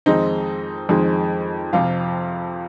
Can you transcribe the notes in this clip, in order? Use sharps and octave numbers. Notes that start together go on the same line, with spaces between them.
F2 D#3 G#3 C4 D#4 D#5
F2 D#3 G#3 C4
F2 C3 F3 F4 F5